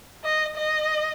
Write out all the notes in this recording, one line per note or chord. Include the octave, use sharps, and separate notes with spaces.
D#5
D#5